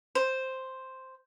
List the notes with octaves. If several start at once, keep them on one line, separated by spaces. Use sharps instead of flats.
C5